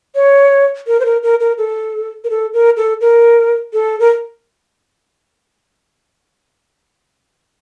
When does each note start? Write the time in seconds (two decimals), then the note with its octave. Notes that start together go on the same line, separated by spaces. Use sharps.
0.15 C#5
0.87 A#4
1.00 C5
1.05 A#4
1.23 A#4
1.40 A#4
1.58 A4
2.24 A#4
2.30 A4
2.53 A#4
2.77 A4
3.01 A#4
3.73 A4
4.00 A#4